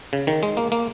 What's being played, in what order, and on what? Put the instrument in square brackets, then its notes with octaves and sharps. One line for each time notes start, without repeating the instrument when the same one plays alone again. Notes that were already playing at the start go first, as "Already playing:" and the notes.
[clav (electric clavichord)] C#3
D#3
G#3
A#3
A#3